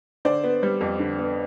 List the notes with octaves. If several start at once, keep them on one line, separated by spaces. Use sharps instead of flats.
D3 C5 D5
B3
G3
F2
D3
B3